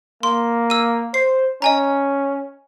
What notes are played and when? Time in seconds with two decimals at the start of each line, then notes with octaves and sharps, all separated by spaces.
0.23 A#3 C6
0.70 E6 D#7
1.14 C5 C7
1.62 C#4 D#5 G#5 A#5